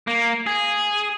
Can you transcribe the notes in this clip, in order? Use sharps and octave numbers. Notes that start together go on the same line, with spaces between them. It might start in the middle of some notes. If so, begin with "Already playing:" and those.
A#3
G#4